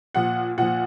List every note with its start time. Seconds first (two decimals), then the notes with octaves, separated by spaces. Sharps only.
0.15 A#2 F3 F#5
0.57 A#2 F3 F#5